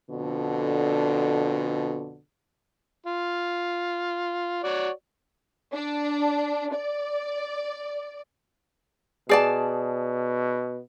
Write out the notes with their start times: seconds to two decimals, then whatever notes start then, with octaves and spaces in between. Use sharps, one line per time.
0.11 F2 B2 D3
3.06 F4
4.64 F#4 C#5 D5
5.74 D4
6.74 D5
9.29 B2 G#4 D5 A5